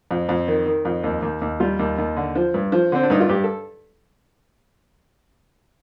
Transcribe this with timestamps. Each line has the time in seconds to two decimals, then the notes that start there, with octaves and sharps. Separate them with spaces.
0.11 F2
0.29 F2
0.48 D#3
0.66 D#3
0.85 F2
1.04 D#2
1.22 D#2
1.41 D#2
1.60 G3 F4
1.79 D#2
1.98 D#2
2.17 D3
2.35 F3
2.54 G2
2.72 F3
2.92 D3 C4
3.03 D4
3.10 G2 D#4
3.20 F4
3.29 G2 G4
3.44 A4